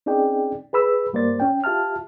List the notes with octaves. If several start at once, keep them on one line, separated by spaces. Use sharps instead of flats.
C4 C#4 D#4 G#4 D5 G5
G#4 B4 B5 E6
G2 G3 A#3 C5 D5 A6
C#4 G5
F4 G4 E5 A5 F6